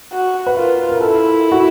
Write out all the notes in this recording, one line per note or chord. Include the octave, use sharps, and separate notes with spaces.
F#4
B4
F4 A#4
A#4
E4 A4
F#4